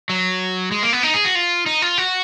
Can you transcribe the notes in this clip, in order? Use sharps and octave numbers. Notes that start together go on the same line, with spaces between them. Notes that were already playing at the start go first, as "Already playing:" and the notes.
F#3
G#3
A#3
B3
D#4
G#4
F#4
F4
D#4
F4
F#4